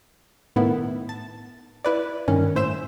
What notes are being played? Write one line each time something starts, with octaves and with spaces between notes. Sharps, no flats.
A2 D#3 B3 E4
A5
E4 B4 D5
G2 D#3 C#4
A2 C5 E5 E7